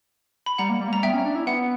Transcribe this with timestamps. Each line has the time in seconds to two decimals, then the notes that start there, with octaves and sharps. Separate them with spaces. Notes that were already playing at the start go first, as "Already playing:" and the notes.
0.46 B5
0.58 G3 F#5 A#5
0.69 A#3
0.81 G3
0.88 A#3
0.92 G3 A#5
1.03 B3 E5 G5
1.13 C#4
1.25 D4
1.35 E4
1.47 B3 F#5